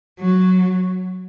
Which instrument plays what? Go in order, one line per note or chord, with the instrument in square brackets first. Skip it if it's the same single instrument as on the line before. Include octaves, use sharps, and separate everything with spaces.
[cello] F#3